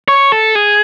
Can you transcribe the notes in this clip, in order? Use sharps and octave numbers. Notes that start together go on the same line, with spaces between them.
C#5
A4
G#4